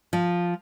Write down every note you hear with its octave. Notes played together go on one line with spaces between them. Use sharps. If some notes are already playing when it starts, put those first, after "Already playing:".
F3